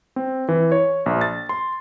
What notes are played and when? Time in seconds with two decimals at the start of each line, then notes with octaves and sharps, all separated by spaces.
0.16 C4
0.48 E3
0.72 C#5
1.06 A#1
1.21 A6
1.49 C6